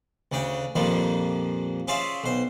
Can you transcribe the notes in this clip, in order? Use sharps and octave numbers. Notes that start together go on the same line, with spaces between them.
D2 C#3 D4 G5
F2 A#2 F3 G3 A#3 D4
C#4 F4 G#4 C5 D5 E5
B1 C5